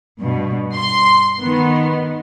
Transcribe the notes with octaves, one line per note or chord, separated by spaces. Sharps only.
G2 B2
C6
D#3 B3